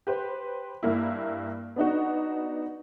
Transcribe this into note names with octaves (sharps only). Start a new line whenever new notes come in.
G4 B4 C5
G2 A#3 E4
B3 D4 D#4 F#4